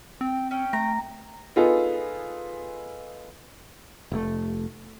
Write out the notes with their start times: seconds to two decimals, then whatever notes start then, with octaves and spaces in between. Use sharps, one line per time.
0.21 C4 G5
0.51 C#4 G5
0.73 A3 A#5
1.56 B3 D#4 F4 G#4 A4
4.12 F1 A3